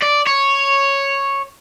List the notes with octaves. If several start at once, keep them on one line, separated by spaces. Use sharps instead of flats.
D5
C#5